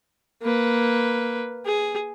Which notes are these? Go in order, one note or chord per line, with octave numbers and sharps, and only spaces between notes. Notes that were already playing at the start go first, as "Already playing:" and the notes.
A#3 B4
G#4